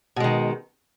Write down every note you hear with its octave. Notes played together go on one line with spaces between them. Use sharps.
B2 D#3 G#3